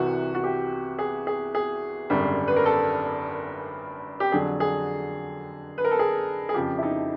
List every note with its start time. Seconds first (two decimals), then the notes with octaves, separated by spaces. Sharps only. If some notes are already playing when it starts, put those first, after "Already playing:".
Already playing: C2 C3 E3 F#4
0.34 F#4
0.44 G4
0.98 G#4
1.27 G#4
1.55 G#4
2.10 G#1 F#2 D3 G3
2.48 B4
2.56 A#4
2.66 A4
4.20 G4
4.32 F2 D3 F#3 G#4
4.60 G#4
5.78 B4
5.84 A#4
5.91 A4
5.99 G#4
6.49 G#4
6.54 F2 C#3 F3 G4
6.78 E4
6.83 D#4